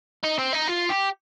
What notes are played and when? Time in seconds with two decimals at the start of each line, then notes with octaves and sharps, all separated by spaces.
0.23 D#4
0.38 C4
0.53 D#4
0.68 F4
0.90 G4